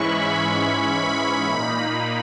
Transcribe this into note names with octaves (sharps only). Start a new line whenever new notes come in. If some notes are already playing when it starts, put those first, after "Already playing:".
Already playing: G#2 E3 G#3 C#4 E4 B5 C#6
B5
B5
A#2 A#3 D#4